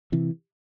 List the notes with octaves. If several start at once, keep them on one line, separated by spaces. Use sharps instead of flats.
C3 E3